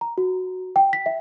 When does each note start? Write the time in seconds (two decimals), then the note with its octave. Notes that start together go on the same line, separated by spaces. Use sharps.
0.01 A#5
0.18 F#4
0.76 G5
0.93 B6
1.06 E5